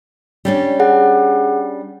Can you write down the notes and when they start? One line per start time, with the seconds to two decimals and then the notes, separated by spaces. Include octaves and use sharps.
0.45 G3 C#4 D4
0.80 G#4 F#5